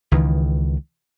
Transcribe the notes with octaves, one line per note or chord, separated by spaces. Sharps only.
C#2 D#3 E3